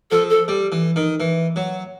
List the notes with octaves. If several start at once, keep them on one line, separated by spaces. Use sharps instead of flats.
F3 A4
A4
G3
E3
D#3
E3
F#3